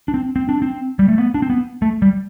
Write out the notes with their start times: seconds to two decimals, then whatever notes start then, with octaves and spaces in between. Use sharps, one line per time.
0.08 D4
0.14 C4
0.36 C4
0.49 D4
0.62 C4
0.99 G3
1.08 A3
1.18 B3
1.34 D4
1.42 C4
1.50 B3
1.82 A3
2.02 G3